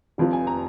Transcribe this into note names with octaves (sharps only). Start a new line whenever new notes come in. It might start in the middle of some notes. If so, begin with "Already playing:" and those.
F1 F2 F3
G#5
A#5